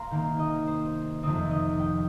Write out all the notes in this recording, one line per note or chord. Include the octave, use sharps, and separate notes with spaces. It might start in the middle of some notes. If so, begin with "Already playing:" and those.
Already playing: F5 A#5 C6
C3 D#3 A#3 G5
D#5
C5
F2 C3 D#3 C4 D#5
D#5
G5